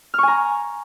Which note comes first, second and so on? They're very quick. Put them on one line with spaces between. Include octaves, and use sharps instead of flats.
F6 C#6 G#5 A#5